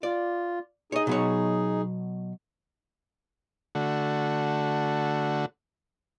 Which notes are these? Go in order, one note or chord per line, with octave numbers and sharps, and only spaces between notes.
F4 D5
D#4 G#4 C#5 D#5
B2 F#3 C#5
D3 A3 F#4